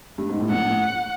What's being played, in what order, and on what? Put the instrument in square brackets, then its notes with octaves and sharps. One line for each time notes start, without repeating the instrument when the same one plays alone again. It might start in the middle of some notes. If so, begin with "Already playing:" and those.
[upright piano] G2
G#2
A2
[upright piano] A#1 A#2 [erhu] F#5
[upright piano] A2